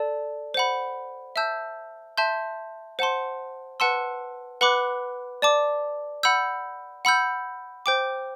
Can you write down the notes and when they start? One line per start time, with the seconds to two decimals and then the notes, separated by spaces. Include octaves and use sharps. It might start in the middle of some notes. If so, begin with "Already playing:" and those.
Already playing: A4 D5 A5
0.54 C5 F#5 B5
1.36 E5 A5 E6 G6
2.17 E5 A5 C6 G6
2.99 C5 F#5 A5 C6
3.80 B4 F#5 A5 C6 E6
4.61 B4 F#5 B5 D6 F#6
5.42 D5 A5 D6
6.23 F#5 B5 E6 G6
7.05 F#5 B5 E6 G6
7.86 C5 G5 D6